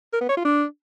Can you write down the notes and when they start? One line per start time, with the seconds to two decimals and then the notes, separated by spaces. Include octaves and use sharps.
0.13 A#4
0.21 B3
0.29 C#5
0.37 F4
0.45 D4